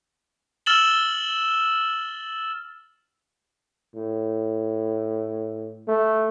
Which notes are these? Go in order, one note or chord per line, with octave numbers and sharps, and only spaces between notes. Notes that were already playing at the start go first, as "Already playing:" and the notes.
E6 F6 A6 E7 F#7 G7
A2
A3